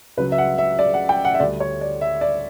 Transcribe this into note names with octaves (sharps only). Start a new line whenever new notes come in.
C#2 C#3 F#3 B4
E5
F#5
E5
D5
F#5
G5
F#5
E5
D2 D3 G3 D5
C#5
D5
E5
D5